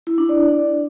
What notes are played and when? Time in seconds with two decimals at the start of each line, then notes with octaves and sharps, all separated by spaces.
0.07 E4
0.18 D4
0.29 D5